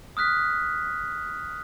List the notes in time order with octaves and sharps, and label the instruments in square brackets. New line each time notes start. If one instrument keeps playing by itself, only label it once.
[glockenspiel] D#6 F6 F#6 B6